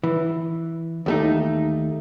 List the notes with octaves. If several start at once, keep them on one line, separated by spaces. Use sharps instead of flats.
E3
D#2 A3 D#4